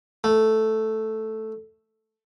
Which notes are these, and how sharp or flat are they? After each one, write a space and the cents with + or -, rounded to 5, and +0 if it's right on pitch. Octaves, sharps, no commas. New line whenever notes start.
A3 +0